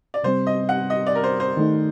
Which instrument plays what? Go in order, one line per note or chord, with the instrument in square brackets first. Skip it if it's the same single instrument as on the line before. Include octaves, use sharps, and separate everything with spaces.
[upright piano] D5
[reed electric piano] C3 G3 C4 [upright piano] C5
[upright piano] D#5
F#5
D#5
D5
A#4
C5
C5
[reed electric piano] D#3 A3 D#4